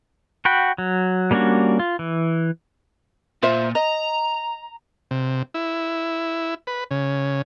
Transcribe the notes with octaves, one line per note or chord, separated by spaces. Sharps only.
F#4 F#5 G5 B5
F#3
G3 A#3 C#4 D4 F#4
F4
E3
A#2 F4 C5 E5
D#5 A#5
C3
E4
B4
C#3